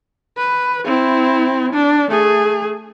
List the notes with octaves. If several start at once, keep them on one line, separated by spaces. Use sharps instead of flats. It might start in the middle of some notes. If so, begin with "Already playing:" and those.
B4
C4 E4
D4
A3 G#4